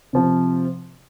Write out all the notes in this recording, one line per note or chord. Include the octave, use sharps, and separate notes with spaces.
C3 F3 C4